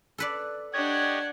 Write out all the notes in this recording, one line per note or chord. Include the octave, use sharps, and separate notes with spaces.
A4 B4 D5
D4 G4 C#5 D#5 F#5 G#6